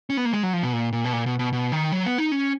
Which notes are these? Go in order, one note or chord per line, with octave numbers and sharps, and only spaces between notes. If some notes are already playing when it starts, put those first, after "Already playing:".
C#4
B3
A#3
G#3
F#3
F3
B2
A#2
A#2
B2
A#2
B2
B2
B2
D#3
F#3
B3
D#4
C#4